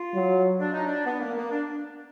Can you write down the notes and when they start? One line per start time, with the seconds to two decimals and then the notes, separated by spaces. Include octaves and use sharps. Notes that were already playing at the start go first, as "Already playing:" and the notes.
Already playing: F4
0.14 F#3
0.59 D4
0.72 D#4
0.85 D4
1.05 B3
1.20 A#3
1.36 A#3
1.51 D4